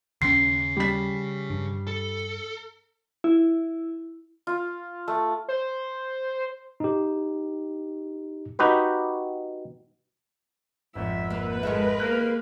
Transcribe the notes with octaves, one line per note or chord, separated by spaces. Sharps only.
D#2 C#3 C#4 C6 C7
G3 B6
G2
A4
E4
F4
A3
C5
D#4 G4
D#4 F#4 G4 B4
G#1 F2 E5
A#3 B4
G#3 A4 A#4 D#5 E5
A#3 A#4 F#6